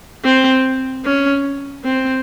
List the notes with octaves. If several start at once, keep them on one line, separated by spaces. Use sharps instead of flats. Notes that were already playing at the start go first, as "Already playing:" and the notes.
C4
C#4
C4